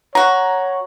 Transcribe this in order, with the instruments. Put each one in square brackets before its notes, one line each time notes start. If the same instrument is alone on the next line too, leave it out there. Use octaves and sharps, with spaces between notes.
[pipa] F#3 F#4 [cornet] C#5 [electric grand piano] A#5